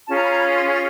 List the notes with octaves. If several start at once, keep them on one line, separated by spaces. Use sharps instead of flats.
C#4 F4 G#4 A5
A#5
B5
A#5
B5
C6
C#6